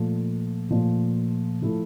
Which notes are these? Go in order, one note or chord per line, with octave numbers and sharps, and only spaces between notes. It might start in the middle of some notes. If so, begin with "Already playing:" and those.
Already playing: A#2 F3 A3
A#2 F3 A3
F3 A3 E4 A4